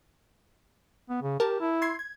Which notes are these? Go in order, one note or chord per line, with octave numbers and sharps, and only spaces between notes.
B3
C#3
G4 A#4 A5
E4
C6 G#6 C7
G#6